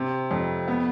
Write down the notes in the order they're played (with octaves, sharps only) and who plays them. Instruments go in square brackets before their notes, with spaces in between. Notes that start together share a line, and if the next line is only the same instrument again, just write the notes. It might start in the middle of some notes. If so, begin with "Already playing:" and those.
Already playing: [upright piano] C3
F2
B3